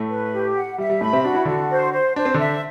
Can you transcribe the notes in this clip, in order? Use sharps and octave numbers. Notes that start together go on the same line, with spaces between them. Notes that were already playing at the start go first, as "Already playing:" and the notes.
Already playing: A2 A3
B4
G4
F#5
G3 E5
G3
A2 A3 B5
C3 C4
D4 F#4
E4
D3 D4 F#4
C5
C5
D4 C5
C4
D3 D4 E5